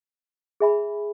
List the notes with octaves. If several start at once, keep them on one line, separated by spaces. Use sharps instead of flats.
G#4 E5 G#5 B5